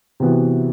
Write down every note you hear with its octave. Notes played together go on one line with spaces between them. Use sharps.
C3 E3 B3 F#4